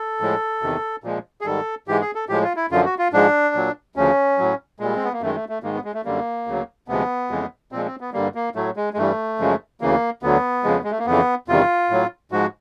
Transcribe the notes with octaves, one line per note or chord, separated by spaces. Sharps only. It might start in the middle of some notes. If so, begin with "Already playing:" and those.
Already playing: A4
A2 F3 G#3
E2 C3 D#3
A#2 F3 G#3
G#4
G#2 D#3 G3 A4
G#2 E3 G#3 G4
G#4
A4
A2 F3 G#3 G4
F4
E4
F#2 D3 F3 F4
F#4
F4
G#2 F3 G#3 D4
A#2 F#3
D2 C#3 F3 C#4
A2 F#3
A#2 G3 G#3
C4
B3
A#3
F#2 D#3 G#3 A3
A3
A3
G#2 D#3 G#3 A#3
B3
G#3
A3
F#2 D3 G3 A#3
D2 C#3 F#3
D2 C3 F3 G#3 B3
F2 C#3 E3 G#3
A#2 F3 G#3 C4
C4
B3
G2 D3 G3 A#3
A#3
A2 F#3 A3
G#3
G#3
G2 E3 G3 A3
F#2 C#3 F3 G#3
D2 C#3 E3 A#3
D2 D3 F#3 B3
F2 C#3 F3 G#3
G#3
A3
A#3
F2 C#3 E3 B3
E2 C3 D#3 G3 F4
A2 F#3
G#2 F3 G#3 F#4